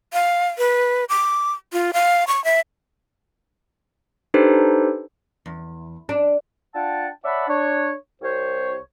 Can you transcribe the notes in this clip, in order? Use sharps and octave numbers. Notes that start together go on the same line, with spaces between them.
F5
B4
D6
F4
F5
C#6
E5
D4 D#4 G4 A4 B4 C5
E2
D4
D4 F4 F#5 G5 A5
C#5 D5 E5 F#5 A5 B5
D4 C#5
C2 C5 C#5